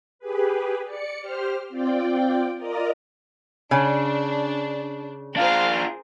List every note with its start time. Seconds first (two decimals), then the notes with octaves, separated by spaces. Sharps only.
0.19 G4 G#4 B4
0.85 D5 C#7
1.19 G4 C5 F6
1.69 C4 F4 D5 G5
2.58 F4 A#4 D5 D#5 A#5
3.71 C#3 D4
5.36 D4 F4 G#4 A#4 C5 F5